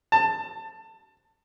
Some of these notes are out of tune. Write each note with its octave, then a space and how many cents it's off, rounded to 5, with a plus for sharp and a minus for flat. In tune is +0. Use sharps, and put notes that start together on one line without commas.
A5 +20